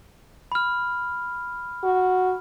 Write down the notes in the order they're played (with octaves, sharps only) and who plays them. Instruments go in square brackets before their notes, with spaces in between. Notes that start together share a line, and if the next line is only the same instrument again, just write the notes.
[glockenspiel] B5 F6
[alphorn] F#4